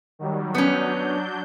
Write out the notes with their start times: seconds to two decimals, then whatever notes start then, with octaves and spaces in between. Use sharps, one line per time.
0.19 D#3 F#3 G3
0.55 F#3 B3 C#4 D4 G6